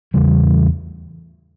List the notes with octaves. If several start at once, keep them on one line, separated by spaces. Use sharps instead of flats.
E2 C#3 E3 G3